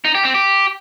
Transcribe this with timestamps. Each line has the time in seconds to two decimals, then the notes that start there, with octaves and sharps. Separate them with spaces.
0.05 D#4
0.15 G4
0.25 C4
0.34 G4